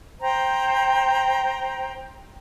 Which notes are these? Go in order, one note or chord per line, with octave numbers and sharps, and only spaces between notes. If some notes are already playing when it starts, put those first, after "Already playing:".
C5 G5 A#5